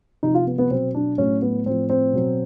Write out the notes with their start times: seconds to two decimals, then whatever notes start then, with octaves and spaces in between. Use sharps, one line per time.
0.23 C3 F3 D#4
0.34 F4
0.47 B3
0.58 B3
0.70 B2 F#3 C4
0.95 D4
1.18 A2 F#3 C#4
1.42 B3
1.66 A2 F3 C4
1.90 C4
2.13 B2 F#3